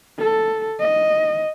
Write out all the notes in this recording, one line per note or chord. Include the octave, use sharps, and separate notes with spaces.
A4
D#5